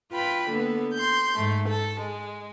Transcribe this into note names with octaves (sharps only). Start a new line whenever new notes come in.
F4 B4 G5 B5
D3 A#3 B3
C6 G6
G#2 A3
A4
G#3